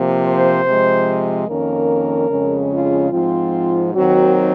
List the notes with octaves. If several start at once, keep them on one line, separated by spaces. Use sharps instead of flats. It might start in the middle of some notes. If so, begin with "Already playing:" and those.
Already playing: C3 F3 A#3
C5
C3 F3 G#3
F2 D#3 A#3 C#4 A#4
F2 C#3 G#3 C#4
F4
G#2 F3 C4 F4
D#2 D#3 F#3 C4 F#4